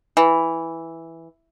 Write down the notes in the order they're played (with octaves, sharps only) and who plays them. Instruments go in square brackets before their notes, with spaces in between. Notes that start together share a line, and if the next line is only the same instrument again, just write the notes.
[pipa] E3